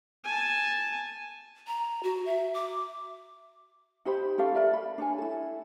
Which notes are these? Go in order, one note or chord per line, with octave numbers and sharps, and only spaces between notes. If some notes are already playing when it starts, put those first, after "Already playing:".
G#5 A5
A#5
F#4
E5
D6
D#4 G4 C5 B5
C#4 G4 A4 F5
A4 A#4 D5 E5
B5
D4 C#5 G#5
E4 A4